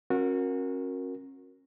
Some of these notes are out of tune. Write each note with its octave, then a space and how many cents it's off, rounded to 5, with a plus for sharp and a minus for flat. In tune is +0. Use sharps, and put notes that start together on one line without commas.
C#4 -40 F#4 -25 A#4 +0